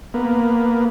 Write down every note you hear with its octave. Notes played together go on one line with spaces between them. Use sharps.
A#3 B3